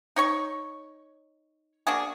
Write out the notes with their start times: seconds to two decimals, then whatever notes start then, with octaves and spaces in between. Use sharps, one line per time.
0.16 D#4 C#5 C#6
1.87 A#3 D4 F#4 G#4